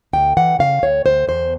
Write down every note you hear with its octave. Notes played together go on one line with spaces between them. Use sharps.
D2 G5
E3 F#5
C#3 F5
D2 C#5
D2 C5
E2 C5